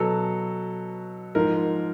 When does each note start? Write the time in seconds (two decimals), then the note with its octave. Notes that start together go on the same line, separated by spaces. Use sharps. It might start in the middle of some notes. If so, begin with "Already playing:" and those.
Already playing: B2 F#3 A4
1.35 G#2 F3 A#4